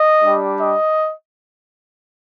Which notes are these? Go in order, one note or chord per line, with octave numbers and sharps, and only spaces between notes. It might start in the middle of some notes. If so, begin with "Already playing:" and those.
Already playing: D#5
G3 D4 G4
D#5